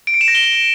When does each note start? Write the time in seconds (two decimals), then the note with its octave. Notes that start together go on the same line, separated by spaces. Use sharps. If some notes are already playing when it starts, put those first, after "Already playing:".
0.07 D7
0.14 C#7
0.21 E7
0.28 A#6
0.35 G7